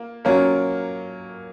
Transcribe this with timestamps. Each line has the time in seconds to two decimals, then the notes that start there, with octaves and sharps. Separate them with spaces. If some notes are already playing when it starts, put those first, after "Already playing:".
Already playing: A#3 F4
0.25 F#3 A#3 C#4 F4 A#4